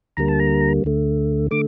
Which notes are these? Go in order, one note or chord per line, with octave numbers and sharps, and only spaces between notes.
D2 D3 G3 A#3 A#5
A5
A#5
D2 D3 A3
D3 A3 D6